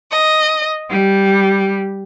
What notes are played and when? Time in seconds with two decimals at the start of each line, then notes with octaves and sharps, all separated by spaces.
0.10 D#5
0.89 G3